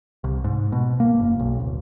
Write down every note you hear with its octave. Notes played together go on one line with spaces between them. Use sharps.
C2
G#2
B2
A#3
F#1
B1
D1